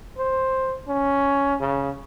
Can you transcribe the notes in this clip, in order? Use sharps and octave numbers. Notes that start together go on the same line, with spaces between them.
C5
C#4
C#3